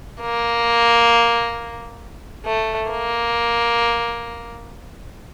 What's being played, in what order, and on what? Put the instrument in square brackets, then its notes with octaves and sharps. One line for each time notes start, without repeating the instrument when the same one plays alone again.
[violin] A#3
A3
A#3